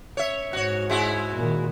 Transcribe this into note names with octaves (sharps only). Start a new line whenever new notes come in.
C#5 E5
G#2 F#4 C#5
G#3 E4 F#4
A#2 D#3